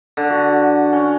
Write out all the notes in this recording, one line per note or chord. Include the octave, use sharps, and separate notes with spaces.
D3
F#4
C#4